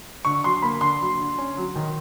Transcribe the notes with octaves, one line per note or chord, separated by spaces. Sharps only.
D3 C#6
F#3 C6
A#3 B5
D3 C6
F#3
D3
C#4
F#3
D#3